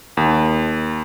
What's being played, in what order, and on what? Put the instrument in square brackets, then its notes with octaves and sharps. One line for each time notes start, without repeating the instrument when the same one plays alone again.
[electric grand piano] D#2